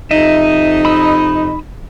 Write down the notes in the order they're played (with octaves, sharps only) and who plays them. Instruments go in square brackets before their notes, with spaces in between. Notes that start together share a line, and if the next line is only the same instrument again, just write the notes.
[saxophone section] F2 C3 D#4 [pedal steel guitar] D#5 E5
[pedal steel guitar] B5 D#6 E6